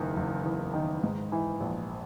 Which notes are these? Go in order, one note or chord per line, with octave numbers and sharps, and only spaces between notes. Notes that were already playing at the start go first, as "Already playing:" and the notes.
Already playing: F#1 E2 D#3
F#1
E2
D#3
G#2
E3
A#1